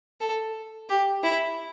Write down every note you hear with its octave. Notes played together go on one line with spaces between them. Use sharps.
A4
G4
E4